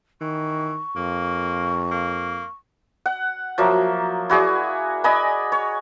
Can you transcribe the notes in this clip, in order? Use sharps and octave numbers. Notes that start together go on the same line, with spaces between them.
D#3 E3 C#6
F2 A#3
A#3
F#5
F3 F#3 A#3 E5
E4 F#4 G#4 D5
D5 D#5 G#5 B5
C#5